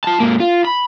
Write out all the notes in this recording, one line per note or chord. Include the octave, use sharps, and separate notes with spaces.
F4 A5
G#2 A#3
F4
B5